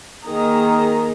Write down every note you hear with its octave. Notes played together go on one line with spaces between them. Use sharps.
D#3 A#3 G#4 D#5 A#5